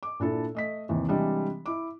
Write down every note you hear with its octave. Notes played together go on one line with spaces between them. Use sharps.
D6
A#2 D4 E4 A4
A3 D#5 B6
D#2 C3 E3
C3 E3 G3 G#3 D4
E4 D6